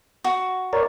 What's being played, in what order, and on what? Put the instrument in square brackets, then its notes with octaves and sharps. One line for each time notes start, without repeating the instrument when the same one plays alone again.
[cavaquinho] F#4
[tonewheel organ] A#4 C#5 D5